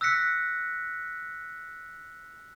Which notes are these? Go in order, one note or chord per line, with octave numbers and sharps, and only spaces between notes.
E6 F#6 A#6 B6 C#7